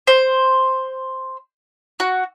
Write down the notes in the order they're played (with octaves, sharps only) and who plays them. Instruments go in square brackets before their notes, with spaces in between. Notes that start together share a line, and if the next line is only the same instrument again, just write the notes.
[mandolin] C5
F#4